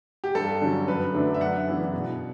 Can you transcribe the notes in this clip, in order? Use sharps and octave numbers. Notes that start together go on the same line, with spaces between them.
G4
G2 A4
D3 F#3 C#4
F#2 B4
D3 F#3 A3 D4
E5
F#2 F#5
C#3 E3 B3 D4
B2